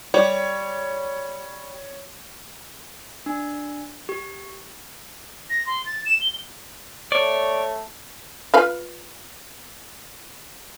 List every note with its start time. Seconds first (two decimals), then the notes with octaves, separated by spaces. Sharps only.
0.14 G3 C#5
3.26 D4
4.09 G4
5.50 A#6
5.67 C6
5.86 A6
6.06 E7
6.21 G7
7.12 A3 C#5 D5
8.54 F4 B4 F5